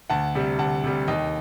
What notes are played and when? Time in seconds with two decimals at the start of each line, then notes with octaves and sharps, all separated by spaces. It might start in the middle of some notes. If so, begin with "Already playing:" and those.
0.10 D2 F#5 A5
0.35 C3 G3
0.59 D2 F#5 A5
0.84 C3 G3
1.08 D#2 D#5 G5